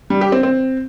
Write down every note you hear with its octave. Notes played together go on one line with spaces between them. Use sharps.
G3
G4
C4
C4